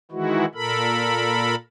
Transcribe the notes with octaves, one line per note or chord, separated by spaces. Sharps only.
D#3 E3 G#3 E4 F#4
A#2 A4 A#4 B5